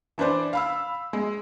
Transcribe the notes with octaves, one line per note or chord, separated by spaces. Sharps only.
E3 D4 B4 C5 D5
F5 B5 E6
G#3